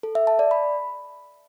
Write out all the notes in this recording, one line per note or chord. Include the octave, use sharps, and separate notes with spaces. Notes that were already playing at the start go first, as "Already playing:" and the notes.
A4
E5
A5
D5
B5